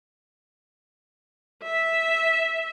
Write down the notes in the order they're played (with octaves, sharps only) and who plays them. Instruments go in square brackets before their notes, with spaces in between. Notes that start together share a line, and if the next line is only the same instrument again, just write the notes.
[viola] E5